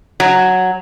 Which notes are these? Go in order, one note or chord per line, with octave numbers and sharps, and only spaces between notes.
F#3